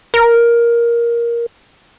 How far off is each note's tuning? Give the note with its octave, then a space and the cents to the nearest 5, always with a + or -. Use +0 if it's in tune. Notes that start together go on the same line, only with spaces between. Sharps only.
A#4 +10